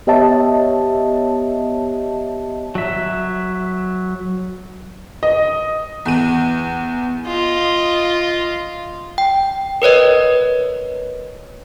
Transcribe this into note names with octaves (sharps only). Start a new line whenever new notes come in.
B3 G4 C#5 D#5 E5 A5
F#3 E5
D#5
E2 D#7
F4 D#5
G5
A#4 B4 C#5 D#5